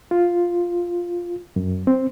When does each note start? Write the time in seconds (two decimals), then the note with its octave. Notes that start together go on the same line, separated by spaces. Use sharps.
0.11 F4
1.56 F#2
1.87 C4